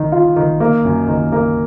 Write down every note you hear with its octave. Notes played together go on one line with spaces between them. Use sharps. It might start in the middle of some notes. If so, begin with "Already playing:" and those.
Already playing: D#3
F4
D#3
A#3
F#2
D#3
A#3